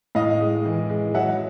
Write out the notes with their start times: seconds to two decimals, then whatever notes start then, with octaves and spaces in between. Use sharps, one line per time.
0.15 A2 D#5 F5
0.40 G#3
0.65 E3
0.89 G#3
1.14 F#3 E5 F#5